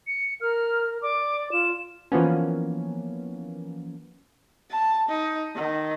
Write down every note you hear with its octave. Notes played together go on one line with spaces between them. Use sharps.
C#7
A#4 F6
D5 D6
F4 E7
E3 F3 A#3 B3 C#4
A5
D#4
D#3